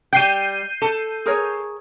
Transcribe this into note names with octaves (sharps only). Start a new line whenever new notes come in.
G3 G5 G6 C7 D#7
A4
G#4 A#4 C#5